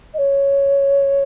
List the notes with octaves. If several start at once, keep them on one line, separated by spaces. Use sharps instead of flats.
D#5
C#5